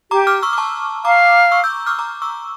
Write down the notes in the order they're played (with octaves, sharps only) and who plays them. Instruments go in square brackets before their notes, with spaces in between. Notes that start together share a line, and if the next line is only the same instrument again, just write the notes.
[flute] G4 [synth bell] A#5 D6
[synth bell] D6 F6
C#6 E6
D6
A5 C#6
[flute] F5 [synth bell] A#5 D6
[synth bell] C#6 E6
E6 G6
D6 F6
A#5 D6
C#6 E6